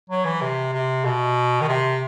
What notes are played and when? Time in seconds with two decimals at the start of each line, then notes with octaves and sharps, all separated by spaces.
0.10 F#3
0.25 E3
0.42 C3
0.73 C3
1.05 B2
1.61 D#3
1.68 C3